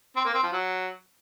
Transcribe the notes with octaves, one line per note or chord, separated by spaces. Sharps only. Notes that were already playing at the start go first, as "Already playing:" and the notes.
C4
A#3
C4
F3
F#3